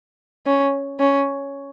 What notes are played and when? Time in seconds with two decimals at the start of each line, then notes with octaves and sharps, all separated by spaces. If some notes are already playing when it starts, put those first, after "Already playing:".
0.46 C#4
1.00 C#4